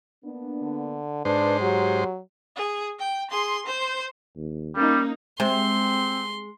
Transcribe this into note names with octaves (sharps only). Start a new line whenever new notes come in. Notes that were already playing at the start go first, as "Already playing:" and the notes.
A#3 B3 D4
D3
G#2 D4 B4 C5
F#3 G4
G#4
G5
G#4 C6
C5
D#2
G3 A#3 C#4 D#4
C3 G#3 C4 C5 C6